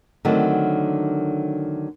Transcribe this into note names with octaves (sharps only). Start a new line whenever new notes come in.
D3 D#3 F#3 A3 C4